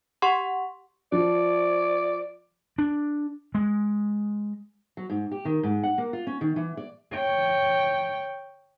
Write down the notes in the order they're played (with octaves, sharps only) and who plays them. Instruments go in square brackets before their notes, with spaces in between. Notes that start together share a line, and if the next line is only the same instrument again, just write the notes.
[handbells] G4 F#5 C6 C#6
[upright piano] F3 [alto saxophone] D5
[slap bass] D4
G#3
[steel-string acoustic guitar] F#3
G#2
G4
D#3
G#2
F#5
A#3
F4
C#4
D#3
E3
D5
[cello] C#5 G5